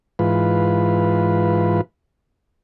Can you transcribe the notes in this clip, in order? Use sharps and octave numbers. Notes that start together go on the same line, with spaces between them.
G#2 E3 F4 B4